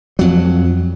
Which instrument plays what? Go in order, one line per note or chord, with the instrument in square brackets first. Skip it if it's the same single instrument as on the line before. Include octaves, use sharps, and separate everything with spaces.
[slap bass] F2 F#3